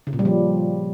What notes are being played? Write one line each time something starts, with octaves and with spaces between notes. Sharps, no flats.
C#3
A#2
G3
F3